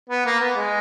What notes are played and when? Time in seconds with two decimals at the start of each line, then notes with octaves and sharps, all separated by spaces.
0.09 B3
0.26 A#3
0.40 B3
0.56 G#3